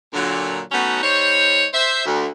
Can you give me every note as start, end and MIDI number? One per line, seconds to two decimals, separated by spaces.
0.13 0.61 46
0.13 0.61 50
0.13 0.61 54
0.72 1.00 54
0.72 1.00 57
0.72 1.00 59
0.72 1.00 61
0.72 1.00 63
0.72 1.00 66
1.03 1.65 55
1.03 1.65 63
1.03 1.65 72
1.03 1.65 73
1.74 2.04 72
1.74 2.04 76
2.05 2.27 38